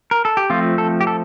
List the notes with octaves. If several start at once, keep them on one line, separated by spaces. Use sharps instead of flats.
A#4
A4
G4
F3 A3 C4 F4
A4
G4
A4